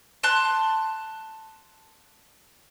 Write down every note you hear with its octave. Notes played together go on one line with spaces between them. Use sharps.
A5 C6 F#6